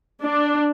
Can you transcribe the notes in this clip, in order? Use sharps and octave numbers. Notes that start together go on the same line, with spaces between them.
D4